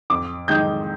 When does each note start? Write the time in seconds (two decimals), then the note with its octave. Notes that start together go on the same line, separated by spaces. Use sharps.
0.10 F2 D6
0.48 D#3 G#3 D#4 G6